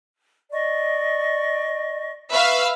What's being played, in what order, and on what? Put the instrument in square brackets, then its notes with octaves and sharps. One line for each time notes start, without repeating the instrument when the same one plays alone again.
[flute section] D5 D#5 C#6
[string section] B4 E5 F5 [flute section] C#6